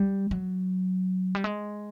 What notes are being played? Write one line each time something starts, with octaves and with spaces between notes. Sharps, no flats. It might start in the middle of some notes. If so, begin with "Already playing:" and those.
Already playing: G3
F#3
G3
G#3